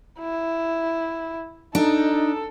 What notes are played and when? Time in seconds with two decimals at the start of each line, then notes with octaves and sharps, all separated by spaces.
0.19 E4
1.75 D4 D#4 A4